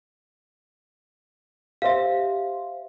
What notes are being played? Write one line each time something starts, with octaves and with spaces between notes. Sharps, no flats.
G4 C5 E5 F5